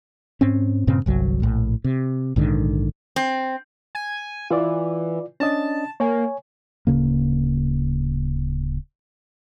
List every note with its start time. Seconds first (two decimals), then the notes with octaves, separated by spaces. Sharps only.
0.41 G#2 C4 C#4
0.87 G2 A#2 C#3 C4
1.06 G1 C2 F#3
1.42 A#1 A2
1.84 C3
2.36 A#1 G#2 D3 D#3
3.16 C4
3.95 G#5
4.50 E3 F4 D5
5.40 C#4 D4 D#5 A5
6.00 A#3 C#5 G#5
6.87 D1 F2 C#3 A#3